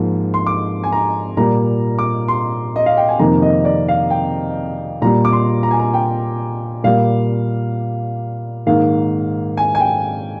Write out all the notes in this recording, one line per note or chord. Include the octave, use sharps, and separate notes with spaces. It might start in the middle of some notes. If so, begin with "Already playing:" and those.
Already playing: G#2 F3 A#3
C6
D6
G#5
A#5
A#2 G3 A#3 A#5
D6
C6
D#5
F5
G5
G#5
F2 C3 D#3 A#3 A#5
D#5
D5
F5
G5
A#2 G3 A#3 A#5
D6
C6
A#5
G#5
A#5
G5
A#2 G3 A#3 F5
G#2 D#3 A#3 F5
G#5
G#5
G5